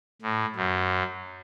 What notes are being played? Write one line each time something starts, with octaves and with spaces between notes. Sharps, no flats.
A2
F#2